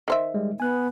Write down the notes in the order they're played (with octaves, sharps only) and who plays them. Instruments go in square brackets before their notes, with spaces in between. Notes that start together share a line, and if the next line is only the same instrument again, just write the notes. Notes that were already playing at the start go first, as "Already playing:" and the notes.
[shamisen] D#3 C5 E5
[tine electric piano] G3 G#3
[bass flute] B3 [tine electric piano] G#5 F#6